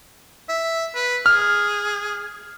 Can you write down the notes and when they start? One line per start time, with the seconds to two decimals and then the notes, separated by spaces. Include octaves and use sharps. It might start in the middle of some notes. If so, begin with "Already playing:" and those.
0.49 E5
0.95 B4
1.26 G#4 F6